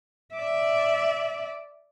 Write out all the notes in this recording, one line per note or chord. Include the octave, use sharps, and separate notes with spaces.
D5 E5